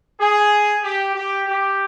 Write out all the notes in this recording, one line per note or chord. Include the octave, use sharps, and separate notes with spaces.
G#4
G4
G4
G4